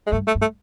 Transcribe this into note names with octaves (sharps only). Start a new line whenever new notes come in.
G#3
G2 A3
A3
G2
A3